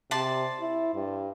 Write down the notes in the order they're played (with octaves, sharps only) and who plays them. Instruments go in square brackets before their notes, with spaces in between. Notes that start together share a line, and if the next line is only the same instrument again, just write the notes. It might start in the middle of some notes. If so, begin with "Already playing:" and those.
[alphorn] C3 [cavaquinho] C5 D5 A5
[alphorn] E4
G2